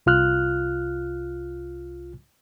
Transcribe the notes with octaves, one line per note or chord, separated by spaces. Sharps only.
C2 F4 F6 F#6